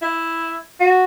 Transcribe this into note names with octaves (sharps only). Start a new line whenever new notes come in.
E4
F#4